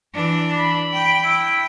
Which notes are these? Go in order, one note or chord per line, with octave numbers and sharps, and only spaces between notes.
E3 D4
B5
G5
E4